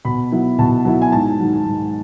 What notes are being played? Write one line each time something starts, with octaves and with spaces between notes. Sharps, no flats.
B2 B5
F#3 B3 E4
B2 A5
F#3 B3 E4
G#5
G#2 A5
D#3 F#3
G#2